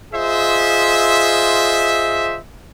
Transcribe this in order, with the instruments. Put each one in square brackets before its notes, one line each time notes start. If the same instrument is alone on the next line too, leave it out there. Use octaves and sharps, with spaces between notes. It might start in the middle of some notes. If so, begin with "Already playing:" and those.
[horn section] F4 G#4 C5 D#5 E5